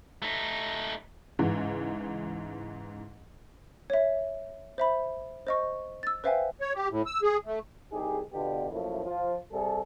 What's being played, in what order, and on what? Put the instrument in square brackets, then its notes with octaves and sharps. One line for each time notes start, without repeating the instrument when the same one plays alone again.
[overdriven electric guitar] A3 D#4
[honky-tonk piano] C#2 G#2 E3
[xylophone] C#5 E5
C5 E5 B5
C5 D#5 C#6
E6 A6
B4 C5 E5 F5 G5 G#5
[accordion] C#5
G4
A2
E6
G#4
A3
[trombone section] C2 D#4 G4 G#4
B2 D3 B3 D4 F4 G4
F#2 F3 A3 A#3 E4
F3 F4
C3 G3 G#4 A4